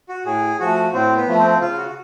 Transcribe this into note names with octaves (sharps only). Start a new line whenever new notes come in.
F#4
A2 G#4
F3 A3 F#4
A2 C4
B3
F3 A3
C4
C#3 F4
F#4
F#4